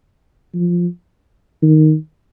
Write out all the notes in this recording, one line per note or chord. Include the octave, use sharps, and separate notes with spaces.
F3
D#3